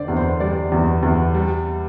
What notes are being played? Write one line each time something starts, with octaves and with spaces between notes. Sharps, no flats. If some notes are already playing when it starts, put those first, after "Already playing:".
Already playing: F1 D3 C5 D5
E2
C5
G3 D5
E2
E2
G3